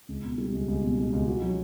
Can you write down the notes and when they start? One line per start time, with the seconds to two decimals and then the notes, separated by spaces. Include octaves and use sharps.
0.08 C#2
0.24 B2
0.38 G3
0.53 C#2
0.68 C#2
0.83 B2
0.98 G3
1.13 C#2
1.28 F#4
1.42 F#3